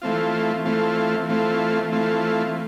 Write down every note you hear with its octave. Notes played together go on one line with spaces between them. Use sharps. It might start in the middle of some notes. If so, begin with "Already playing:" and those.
E3 A3 C4 F4
E3 A3 C4 F4
E3 A3 C4 F4
E3 A3 C4 F4